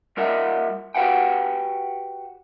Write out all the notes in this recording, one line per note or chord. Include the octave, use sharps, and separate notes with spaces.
G3 F4 A#4 D#5 E5 F#5
F#4 G4 B4 F#5 G5